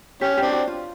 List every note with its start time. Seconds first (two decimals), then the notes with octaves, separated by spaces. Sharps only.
0.21 C#4 G4
0.37 C4 D4 G4
0.52 F#4
0.68 F4